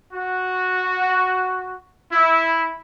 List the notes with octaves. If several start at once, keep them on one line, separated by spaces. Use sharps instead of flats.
F#4
E4